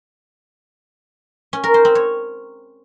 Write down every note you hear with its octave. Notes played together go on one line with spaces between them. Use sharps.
C#4
A#4
C5
C4
C#5